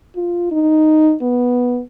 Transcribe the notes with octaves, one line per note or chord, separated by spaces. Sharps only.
F4
D#4
B3